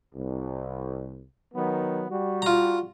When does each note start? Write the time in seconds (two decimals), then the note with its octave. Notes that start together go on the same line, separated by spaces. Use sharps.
0.15 C2
1.54 D#3 F#3 B3
2.09 G3 F#4
2.42 F4 A#5